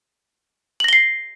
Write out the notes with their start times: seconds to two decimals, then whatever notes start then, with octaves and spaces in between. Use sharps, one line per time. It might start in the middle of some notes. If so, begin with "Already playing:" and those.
0.80 F#7
0.84 A#6
0.89 G7
0.93 C7